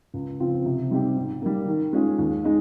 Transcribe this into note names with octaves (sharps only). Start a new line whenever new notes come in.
C#2
C#3 F3 C4 F4
C3
G3 C4 D#4 G4
G#2
G3 A#3
D#3
G#3 C#4 F4 G#4
D#2
G#3 D#4